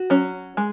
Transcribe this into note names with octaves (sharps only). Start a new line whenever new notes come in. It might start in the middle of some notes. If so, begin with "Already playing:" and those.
Already playing: F#4
F#3 C#4
G#3